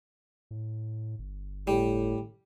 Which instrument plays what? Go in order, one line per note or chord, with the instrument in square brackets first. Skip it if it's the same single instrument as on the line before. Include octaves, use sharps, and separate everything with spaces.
[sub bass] A2
G1
[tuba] A2 [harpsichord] G3